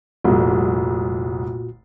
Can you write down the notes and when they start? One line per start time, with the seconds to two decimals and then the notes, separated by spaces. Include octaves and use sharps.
0.24 F1 C2 A#2 F4 F#4